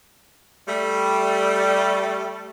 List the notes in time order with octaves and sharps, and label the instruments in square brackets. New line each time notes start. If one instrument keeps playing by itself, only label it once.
[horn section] G3 A3